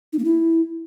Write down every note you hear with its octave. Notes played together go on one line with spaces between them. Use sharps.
D#4
A#3
E4